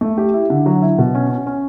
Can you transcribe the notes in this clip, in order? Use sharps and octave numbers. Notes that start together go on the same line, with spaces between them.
A3
G4
E4
D3
F#3
E4
B2
C#4
C#4
C#4